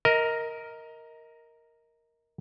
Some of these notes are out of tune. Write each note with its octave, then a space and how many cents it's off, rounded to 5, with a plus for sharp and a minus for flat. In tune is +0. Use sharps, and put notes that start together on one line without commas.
A#4 +0 D#5 +25